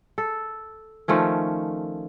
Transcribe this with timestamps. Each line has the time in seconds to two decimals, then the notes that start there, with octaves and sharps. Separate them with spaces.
0.18 A4
1.08 D#3 F3 A3 C#4